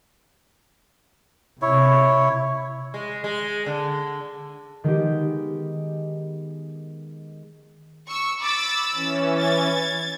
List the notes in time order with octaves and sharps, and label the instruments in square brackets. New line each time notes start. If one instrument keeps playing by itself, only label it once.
[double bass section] C3 [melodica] E4 C#5
[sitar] G#3
G#3
D3
[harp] D#3 G#3 B3 G4
[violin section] C#6 E6
[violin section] B5 E6 A6 [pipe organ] D6
[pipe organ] E3 C#4
[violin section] G#6 A6